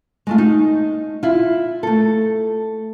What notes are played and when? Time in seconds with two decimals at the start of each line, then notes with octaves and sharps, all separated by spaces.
0.27 G#3 A3 F4
0.38 D#4
1.23 E4 F4
1.83 A3 A4